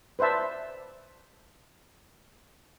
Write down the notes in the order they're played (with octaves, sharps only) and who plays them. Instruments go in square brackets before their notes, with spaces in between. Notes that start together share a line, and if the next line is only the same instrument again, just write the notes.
[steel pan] B4 C5 D5 E5 A5